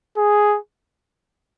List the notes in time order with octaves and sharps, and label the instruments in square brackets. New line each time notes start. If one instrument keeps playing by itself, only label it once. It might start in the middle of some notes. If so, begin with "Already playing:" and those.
[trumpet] G#4